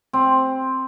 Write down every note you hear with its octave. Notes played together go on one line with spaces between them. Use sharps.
C4